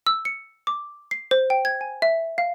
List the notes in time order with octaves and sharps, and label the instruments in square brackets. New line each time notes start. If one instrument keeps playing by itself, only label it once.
[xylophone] E6
C#7
D6
C7
C5
G5
G#6
G#5
E5
F5